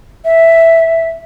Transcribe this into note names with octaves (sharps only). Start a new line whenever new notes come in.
E5